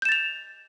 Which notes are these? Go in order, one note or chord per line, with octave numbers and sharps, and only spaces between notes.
G6 A6 E7 F7